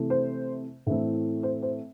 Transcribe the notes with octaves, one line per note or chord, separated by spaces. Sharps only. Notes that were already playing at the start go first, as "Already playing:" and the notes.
Already playing: C3 E3 A3
C5
A2 E3 A3 C4
C5
C5